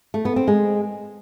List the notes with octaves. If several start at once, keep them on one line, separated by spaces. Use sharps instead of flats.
A3
B3
C4
G#3